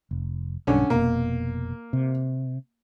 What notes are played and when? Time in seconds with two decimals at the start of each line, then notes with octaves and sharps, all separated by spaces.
0.11 F1
0.67 B1 G2 D3 C#4
0.90 F1 B2 A#3
1.93 C3